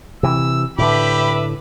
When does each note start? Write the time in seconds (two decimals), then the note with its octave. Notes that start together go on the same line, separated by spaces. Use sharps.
0.23 C3 E3 E6
0.78 A2 D3 G4 B4 E5 B5 D6